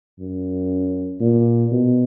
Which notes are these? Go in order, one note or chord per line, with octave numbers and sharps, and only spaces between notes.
F#2
A#2
B2